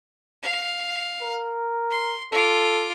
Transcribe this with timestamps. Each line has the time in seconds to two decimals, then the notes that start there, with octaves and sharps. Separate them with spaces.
0.43 F5
1.21 A#4
1.91 C6
2.32 F4 A4 D6